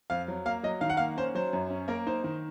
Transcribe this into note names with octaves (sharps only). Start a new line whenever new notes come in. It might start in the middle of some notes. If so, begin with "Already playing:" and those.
F2 F5
F#3
A#3 F5
F#3 D#5
D#3 F5
F#5
A#3 F5
C#4 C5
F#3 C5
F#2
C#4
A#3 A#4
D#4 C5
D#3